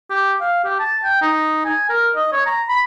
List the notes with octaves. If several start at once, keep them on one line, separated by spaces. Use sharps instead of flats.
G4
F5
G4
A5
G5
D#4
G#5
A#4
D#5
C#5
A#5
B5